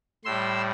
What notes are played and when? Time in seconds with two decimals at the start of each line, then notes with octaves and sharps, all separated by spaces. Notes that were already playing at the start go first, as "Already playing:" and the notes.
0.25 A2 G3 C6 E6